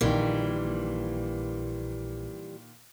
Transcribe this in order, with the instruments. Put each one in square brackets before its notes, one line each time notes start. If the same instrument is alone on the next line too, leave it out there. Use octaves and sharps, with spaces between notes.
[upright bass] A#1 [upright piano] A#2 D#3 [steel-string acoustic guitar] E3 G3